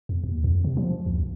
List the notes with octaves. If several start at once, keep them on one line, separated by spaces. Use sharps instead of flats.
E2
D#2
F2
C3
F3
D2
C#2